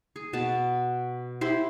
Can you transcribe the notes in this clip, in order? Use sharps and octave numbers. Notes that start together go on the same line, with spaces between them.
G#4
B2 A5
E4 G4 C5